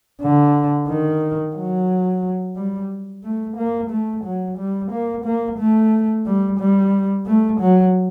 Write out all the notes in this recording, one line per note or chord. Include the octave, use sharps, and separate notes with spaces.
D3
D#3
F#3
G3
A3
A#3
A3
F#3
G3
A#3
A#3
A3
G3
G3
A3
F#3